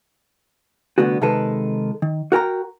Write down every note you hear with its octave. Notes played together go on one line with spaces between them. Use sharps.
C2 D3 A3 B3 F#4
C3 D#3 G#3 A4 B4
D#3
F#4 A#4 G5 A#5